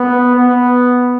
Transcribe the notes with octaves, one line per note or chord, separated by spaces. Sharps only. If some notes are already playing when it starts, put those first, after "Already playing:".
Already playing: B3
B3